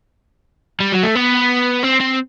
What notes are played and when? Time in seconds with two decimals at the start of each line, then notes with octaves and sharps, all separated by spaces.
0.80 G3
0.92 F#3
1.03 A3
1.15 B3
1.83 C4
2.00 C4